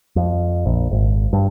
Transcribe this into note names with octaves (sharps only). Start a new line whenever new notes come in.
F2
A#1
G#1
G2